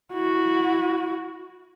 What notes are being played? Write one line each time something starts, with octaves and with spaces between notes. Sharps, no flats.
E4 F#4